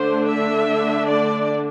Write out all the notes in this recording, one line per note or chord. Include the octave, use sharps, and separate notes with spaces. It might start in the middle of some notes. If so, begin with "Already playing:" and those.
Already playing: D3 A3 D4 C5
E5
D5